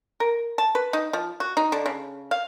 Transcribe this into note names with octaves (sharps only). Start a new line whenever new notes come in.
A#4
A5
B4
D#4
F3
F#4
D#4
D3
C#3
F5